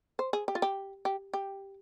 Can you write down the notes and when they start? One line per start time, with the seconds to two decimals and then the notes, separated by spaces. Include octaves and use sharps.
0.19 C5
0.33 G#4
0.48 G4
0.55 F4
0.62 G4
1.05 G4
1.33 G4